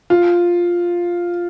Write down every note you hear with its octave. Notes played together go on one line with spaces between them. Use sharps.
F4